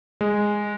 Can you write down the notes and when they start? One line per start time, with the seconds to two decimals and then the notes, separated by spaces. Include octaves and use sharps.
0.21 G#3